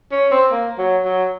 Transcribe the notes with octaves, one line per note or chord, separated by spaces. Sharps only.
C#4
C4
A#3
F#3
F#3